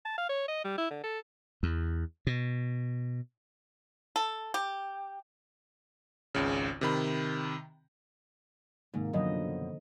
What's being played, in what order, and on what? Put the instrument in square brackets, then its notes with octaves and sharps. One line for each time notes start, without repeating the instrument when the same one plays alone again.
[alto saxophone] A5
F5
C#5
D#5
G3
E4
D3
A4
[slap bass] E2
B2
[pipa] A4
G4
[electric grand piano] G#1 C#2 C#3
C3 D#3 B5
[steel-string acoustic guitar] G#2 [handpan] C3 D#3 A#3
[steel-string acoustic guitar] F#2 B2 [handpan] D3 F3 D#5